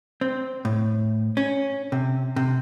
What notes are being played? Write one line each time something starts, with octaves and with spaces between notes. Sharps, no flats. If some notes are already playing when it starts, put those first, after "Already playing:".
C4
A2
C#4
C3
C3